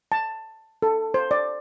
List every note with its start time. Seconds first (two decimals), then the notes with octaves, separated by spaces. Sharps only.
0.12 A5
0.82 A4
1.14 C5
1.31 D5